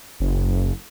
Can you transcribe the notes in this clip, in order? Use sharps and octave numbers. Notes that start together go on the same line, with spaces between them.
F#1